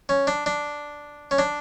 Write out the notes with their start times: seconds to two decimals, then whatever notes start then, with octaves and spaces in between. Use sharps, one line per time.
0.09 C#4
0.27 D4
0.46 D4
1.31 C#4
1.39 D4